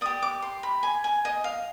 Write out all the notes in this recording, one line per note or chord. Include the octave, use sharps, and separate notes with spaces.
G4 D5 D#6
D6
C6
B5
G#5
G#5
D#5
F5